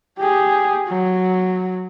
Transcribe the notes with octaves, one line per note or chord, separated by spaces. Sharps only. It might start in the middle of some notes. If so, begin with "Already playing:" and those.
G4 G#4
F#3